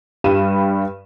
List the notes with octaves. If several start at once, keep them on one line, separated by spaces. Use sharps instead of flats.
G2 G3 B5 D#7 E7